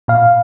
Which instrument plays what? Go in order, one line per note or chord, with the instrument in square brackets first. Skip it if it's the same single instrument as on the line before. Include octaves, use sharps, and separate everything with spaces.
[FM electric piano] A#2 F5